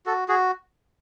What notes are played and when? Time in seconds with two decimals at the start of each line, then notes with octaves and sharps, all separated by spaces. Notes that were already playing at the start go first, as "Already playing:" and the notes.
0.06 F#4 A4
0.28 F#4 G#4